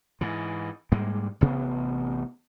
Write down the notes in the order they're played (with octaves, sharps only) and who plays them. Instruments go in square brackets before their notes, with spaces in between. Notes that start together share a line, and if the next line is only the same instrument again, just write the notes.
[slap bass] G#2 E3
G#2 G3 G#3 A#3
A1 C3 B3